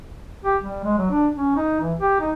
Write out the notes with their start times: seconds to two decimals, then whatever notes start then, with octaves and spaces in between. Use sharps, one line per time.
0.45 G4
0.62 G3
0.84 G#3
0.98 F#3
1.11 D4
1.34 C#4
1.56 D#4
1.81 E3
1.98 G4
2.20 D#4